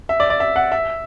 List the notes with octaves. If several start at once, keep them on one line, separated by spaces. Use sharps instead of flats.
E5
D5
D5
E5
F#5
E5